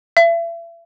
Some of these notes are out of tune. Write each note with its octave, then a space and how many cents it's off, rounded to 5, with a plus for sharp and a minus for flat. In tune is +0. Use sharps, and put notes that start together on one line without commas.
E5 +40